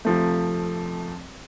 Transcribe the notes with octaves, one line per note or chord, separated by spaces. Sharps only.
F2 C3 F3 A3